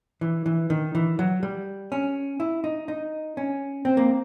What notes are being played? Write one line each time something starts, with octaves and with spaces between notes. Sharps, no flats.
E3
E3
D#3
E3
F#3
G3
C#4
E4
D#4
D#4
C#4
C4
A#3